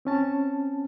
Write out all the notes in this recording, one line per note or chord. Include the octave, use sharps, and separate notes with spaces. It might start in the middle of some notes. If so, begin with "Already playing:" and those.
C4 C#4 A5